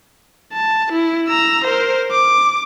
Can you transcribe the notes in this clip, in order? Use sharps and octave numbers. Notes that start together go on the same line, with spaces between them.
A5
E4
A#5 E6
A#4 C5
D6